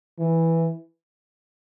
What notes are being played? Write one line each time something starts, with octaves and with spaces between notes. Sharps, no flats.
E3